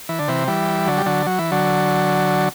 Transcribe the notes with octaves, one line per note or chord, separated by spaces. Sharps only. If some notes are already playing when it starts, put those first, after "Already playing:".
E3
D3
C3 E3
E3 G3
D3 F#3
G3
D3 F#3
F#3
E3
D3 F#3